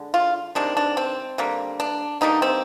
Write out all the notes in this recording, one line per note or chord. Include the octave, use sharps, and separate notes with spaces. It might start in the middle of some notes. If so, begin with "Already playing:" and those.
Already playing: D3 G#3
F4
C3 D#3 G#3 D4
D4
C4
D3 G3 A#3
D4
D3 G3 A#3 D#4
C4